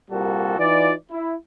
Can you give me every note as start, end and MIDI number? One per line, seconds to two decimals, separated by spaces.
0.11 0.55 36
0.11 0.55 46
0.11 0.55 55
0.11 0.55 58
0.11 0.55 66
0.11 0.55 69
0.58 0.92 52
0.58 0.92 63
0.58 0.92 65
0.58 0.92 74
1.11 1.34 64